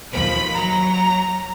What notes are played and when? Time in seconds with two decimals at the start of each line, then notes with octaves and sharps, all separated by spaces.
0.13 D#2 F3 B5
0.55 F#3 A#5